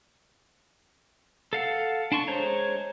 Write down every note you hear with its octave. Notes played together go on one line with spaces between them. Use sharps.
A4 F5 F#5
D4 A5 C6 C#6
G#3 C5 C#5 A#5